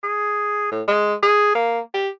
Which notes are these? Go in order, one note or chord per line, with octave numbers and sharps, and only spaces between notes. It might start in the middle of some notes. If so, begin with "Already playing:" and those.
G#4
A2
G#3
G#4
A#3
G4